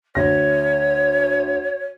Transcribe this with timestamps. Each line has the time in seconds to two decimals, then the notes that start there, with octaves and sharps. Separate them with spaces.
0.15 D2 C#5 A#6